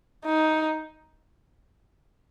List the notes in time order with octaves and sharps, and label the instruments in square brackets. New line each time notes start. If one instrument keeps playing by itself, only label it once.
[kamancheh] D#4